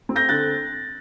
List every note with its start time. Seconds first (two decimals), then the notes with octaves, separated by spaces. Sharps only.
0.09 C4
0.16 G6 A#6
0.29 D3 F#6 A6